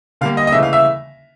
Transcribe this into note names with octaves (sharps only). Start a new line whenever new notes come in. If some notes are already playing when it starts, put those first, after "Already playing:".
D3 G3 A#3 F5
D#5
D#5
C#3 E3 A3 E5
F5
E5